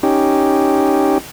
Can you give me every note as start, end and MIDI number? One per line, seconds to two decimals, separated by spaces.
0.03 1.18 61
0.03 1.18 63
0.03 1.18 67